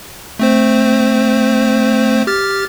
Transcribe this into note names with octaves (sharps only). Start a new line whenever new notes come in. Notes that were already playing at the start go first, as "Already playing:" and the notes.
A3 C4 C5
G4 F6 A6